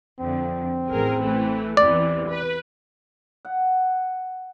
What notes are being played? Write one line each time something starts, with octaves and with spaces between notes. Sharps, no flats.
F2 D3 C4
A1 G#4 A#4
E3 A3
E2 C3 E3 D5
B4
F#5